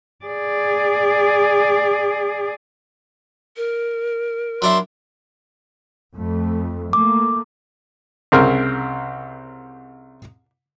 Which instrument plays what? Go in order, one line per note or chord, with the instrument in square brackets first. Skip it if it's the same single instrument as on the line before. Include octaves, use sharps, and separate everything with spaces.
[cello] G#4 D5
[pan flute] A#4
[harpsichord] F#3 D4 E4 [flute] C6
[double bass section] F2 A3
[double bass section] A3 A#3 [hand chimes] D6
[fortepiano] C2 C#3 C4 A#4 C6 F6